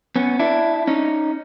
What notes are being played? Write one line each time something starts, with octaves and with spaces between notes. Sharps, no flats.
B3 C#4
D4 E4
C#4 D#4